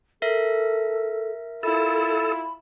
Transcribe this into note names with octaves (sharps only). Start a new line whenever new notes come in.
A4 A#4 E5 A#6
E4 F4 A4 B5